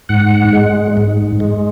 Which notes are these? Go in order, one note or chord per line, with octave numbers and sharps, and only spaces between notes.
G#2 F#5
G#3
G#2
G#3